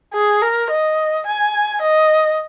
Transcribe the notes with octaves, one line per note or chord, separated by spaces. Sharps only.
G#4
A#4
D#5
G#5
D#5